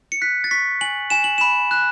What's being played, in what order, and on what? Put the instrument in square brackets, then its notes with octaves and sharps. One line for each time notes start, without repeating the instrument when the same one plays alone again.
[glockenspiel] C#7
F#6 B6
A6
C#6 B6
G#5 F#7
G#5 E7
F#7
B5 E7
F#6